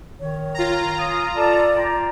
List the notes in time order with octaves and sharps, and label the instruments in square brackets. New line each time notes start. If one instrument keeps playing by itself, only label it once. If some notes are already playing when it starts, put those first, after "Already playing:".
[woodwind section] D#3 [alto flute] C#5
[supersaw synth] F4 A#5
[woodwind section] F5 G#5 D#6
[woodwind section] A4 A5 [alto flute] D5
[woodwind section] F4 G5 A#5